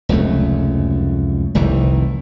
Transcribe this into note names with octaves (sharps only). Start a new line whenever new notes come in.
F1 C#2 F#2 A3
F1 C2 D#3 E3